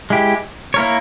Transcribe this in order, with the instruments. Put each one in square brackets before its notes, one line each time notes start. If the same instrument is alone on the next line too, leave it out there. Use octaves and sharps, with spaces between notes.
[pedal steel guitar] G#3 E4 G4
A#3 E4 A#4 C#5